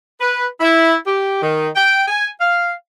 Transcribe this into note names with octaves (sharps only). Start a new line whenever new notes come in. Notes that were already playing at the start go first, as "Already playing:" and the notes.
B4
E4
G4
D#3
G5
G#5
F5